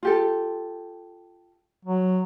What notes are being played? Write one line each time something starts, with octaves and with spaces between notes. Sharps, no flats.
F4 G4 A4
F#3